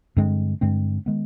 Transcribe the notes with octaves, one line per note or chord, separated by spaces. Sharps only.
G2 D3 G#3 C4
G2 D3 G#3 C4
D#3 G#3 B3